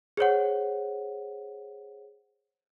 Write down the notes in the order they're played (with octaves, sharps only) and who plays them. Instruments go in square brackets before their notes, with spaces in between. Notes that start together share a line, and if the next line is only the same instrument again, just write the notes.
[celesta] G#4 C5 C#5 F#5